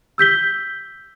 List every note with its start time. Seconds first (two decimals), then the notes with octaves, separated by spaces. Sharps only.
0.18 E6 G6 B6 G7